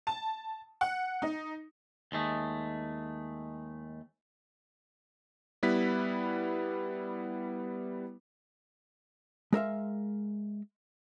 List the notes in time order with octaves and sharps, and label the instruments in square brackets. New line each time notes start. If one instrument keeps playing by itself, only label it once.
[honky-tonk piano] A5
F#5
D#4
[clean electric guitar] D#2 G#3 A3
[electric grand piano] G3 B3 E4 B4 B6
[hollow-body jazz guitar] G#3 A#4 E5 F5